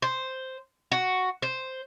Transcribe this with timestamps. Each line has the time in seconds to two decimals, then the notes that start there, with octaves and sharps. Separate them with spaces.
0.02 C5
0.92 F#4
1.42 C5